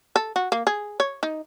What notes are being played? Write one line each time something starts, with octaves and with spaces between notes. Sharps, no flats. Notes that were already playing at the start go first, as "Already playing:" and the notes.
A4
F#4
A#3
G#4
C#5
D#4